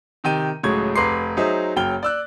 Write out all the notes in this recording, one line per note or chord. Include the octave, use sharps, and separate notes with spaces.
C3 D#3 G5 D#7
C#2 A2 F#3 G#4 C#6 G#6
F1 B4 A#5 C6 D6 C7
F#3 D#4 G#4 C5 E5
F#1 F#3 G5 F6 G7
D5 E6 F#6